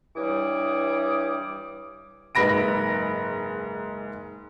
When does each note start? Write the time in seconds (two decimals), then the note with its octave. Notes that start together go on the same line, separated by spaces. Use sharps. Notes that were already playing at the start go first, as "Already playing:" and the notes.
0.15 G2 E3 G3 C#5 D6 D#6
2.35 F#1 G#2 B4 B5 A#6 D7